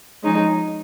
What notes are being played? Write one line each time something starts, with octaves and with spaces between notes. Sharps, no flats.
F3 G#3 C#4 D#4